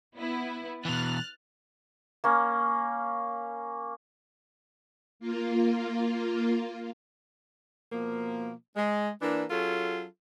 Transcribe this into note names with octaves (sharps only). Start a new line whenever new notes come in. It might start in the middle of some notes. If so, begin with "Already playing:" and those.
B3 E4 B4
B2 E3 F6 F#6 A6
A#3 C#4
A#3 F4
B2 F3 A#3
G#3
E3 A#3 D4
F#3 C#4 F4 G#4 A4